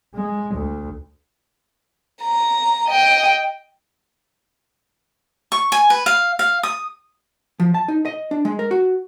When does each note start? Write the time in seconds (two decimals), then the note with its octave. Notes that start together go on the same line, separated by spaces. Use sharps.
0.15 G#3
0.55 D2
2.22 A#5
2.88 D#5 G5
5.52 C#6
5.72 G#5
5.90 B4
6.06 F5
6.39 F5
6.63 D#6
7.60 F3
7.74 A5
7.88 D#4
8.05 D#5
8.31 D4
8.45 G#3
8.59 A#4
8.71 F#4